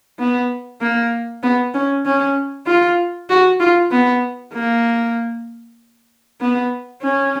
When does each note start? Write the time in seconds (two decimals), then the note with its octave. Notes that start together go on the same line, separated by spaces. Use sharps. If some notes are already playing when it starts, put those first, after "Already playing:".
0.19 B3
0.81 A#3
1.43 B3
1.74 C#4
2.06 C#4
2.67 F4
3.30 F#4
3.60 F4
3.91 B3
4.53 A#3
6.41 B3
7.02 C#4